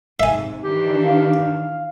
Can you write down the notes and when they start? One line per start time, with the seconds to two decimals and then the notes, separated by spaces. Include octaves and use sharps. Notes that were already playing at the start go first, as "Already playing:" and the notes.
0.20 G#2 C3 E5 G#5
0.63 D#3 E3 D4 G4
1.03 F5